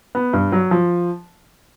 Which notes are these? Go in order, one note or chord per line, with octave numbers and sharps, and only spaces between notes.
B3
G2
F#3
F3